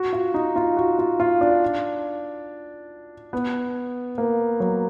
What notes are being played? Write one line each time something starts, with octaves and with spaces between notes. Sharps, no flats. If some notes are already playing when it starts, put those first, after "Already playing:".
Already playing: F#4
F4
D#4
F4
F#4
F4
F4
D4
B3
A#3
F#3